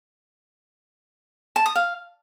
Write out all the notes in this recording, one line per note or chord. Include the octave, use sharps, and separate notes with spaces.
A5
D#6
F5